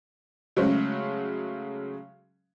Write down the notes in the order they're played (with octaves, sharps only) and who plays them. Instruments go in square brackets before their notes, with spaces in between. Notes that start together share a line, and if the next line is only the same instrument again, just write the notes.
[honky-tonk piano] C#3 F#3 G#3 A3 C#4